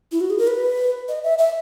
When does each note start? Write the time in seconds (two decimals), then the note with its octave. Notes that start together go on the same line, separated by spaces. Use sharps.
0.12 E4
0.21 F#4
0.30 G#4
0.38 A#4
0.47 B4
1.08 D#5
1.24 E5
1.39 E5